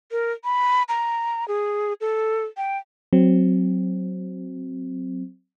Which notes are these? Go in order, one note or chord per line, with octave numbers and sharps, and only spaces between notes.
A#4
B5
A#5
G#4
A4
G5
F#3 C4